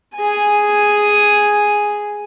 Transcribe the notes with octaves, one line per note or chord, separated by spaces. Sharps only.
G#4 G#5